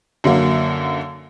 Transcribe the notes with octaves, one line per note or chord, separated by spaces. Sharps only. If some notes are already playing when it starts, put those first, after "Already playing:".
F#2 D3 F#3 A#3